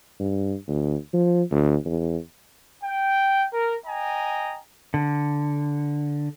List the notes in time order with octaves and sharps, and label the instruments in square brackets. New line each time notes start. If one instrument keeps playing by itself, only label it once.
[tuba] G2
D2
F3
D2
E2
[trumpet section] G5
A#4
D#5 G5 G#5 A#5
[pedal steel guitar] D3